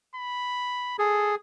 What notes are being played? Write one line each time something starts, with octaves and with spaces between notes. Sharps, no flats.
B5
G#4 A4